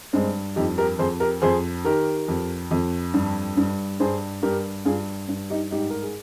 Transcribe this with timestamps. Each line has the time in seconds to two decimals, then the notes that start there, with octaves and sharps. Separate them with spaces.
0.13 G2 G#3 C4
0.56 F2 D#4 G4
0.78 G4 A#4
0.99 F2 G#4 C5
1.20 G4 A#4
1.42 F2 G#4 C5
1.84 D#3 G4 A#4
2.28 F2
2.71 F2
3.14 G2
3.57 G2
4.00 G2 G#4 C5
4.43 G2 G4 A#4
4.85 G2 F4 G#4
5.29 G2
5.50 D#4 G4
5.71 G#2 D#4 G4
5.90 A#4
6.03 G#4